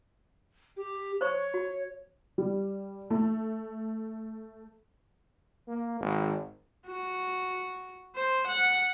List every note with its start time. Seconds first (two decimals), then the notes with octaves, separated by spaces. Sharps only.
0.77 G4
1.21 C5 C#5 C#6
1.54 F#4
2.38 G3
3.10 A3
5.68 A#3
6.00 G#1
6.86 F#4
8.15 C5
8.47 F#5